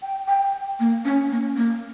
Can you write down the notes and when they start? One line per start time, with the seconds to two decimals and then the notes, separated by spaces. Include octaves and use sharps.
0.02 G5
0.28 G5
0.80 A#3
1.05 C#4
1.31 A#3
1.57 A#3